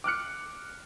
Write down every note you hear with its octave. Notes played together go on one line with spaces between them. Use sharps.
D6 F6 F#6 C#7